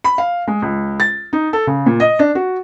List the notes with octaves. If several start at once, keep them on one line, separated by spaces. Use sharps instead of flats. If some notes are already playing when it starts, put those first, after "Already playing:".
B5
F5
G#3
C#2
A6
D#4
A4
C#3
A#2
D#5
D4
F#4